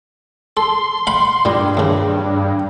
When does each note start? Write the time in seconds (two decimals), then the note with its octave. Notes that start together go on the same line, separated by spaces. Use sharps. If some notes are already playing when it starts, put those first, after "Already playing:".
0.57 A4 C6
1.07 F5 F#5 B5
1.45 G2 A#2 G3
1.77 D#2 C#3